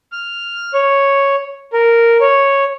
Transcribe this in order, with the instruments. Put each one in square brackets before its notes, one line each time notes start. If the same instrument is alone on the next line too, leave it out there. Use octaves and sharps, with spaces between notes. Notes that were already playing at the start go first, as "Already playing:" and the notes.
[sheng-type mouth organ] F6
C#5
A#4
C#5